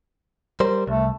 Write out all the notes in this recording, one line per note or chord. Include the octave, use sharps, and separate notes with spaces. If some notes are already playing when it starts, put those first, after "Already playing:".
G3 A#4 C5
C2 A3